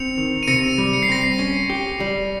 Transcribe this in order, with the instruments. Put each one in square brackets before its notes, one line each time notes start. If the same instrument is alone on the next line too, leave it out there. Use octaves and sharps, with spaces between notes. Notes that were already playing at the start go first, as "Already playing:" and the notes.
Already playing: [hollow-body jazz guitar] C4 [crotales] C#7 F7
[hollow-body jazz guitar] D#3
[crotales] D#7
[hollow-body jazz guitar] C3 [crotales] A#6 C#7
[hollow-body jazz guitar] G3
[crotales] C#7
C7
[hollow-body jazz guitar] C4 [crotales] A#6
[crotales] C7
[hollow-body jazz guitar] C#4
G4
G3